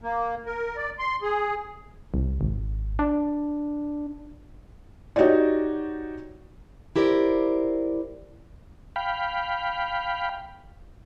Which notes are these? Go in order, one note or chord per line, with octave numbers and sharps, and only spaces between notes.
A#3
A#4
D5
C6
G#4
C2
G#1
D4
D#4 F#4 G4 C#5 D5
E4 G4 A#4 C5 D5
F5 G5 B5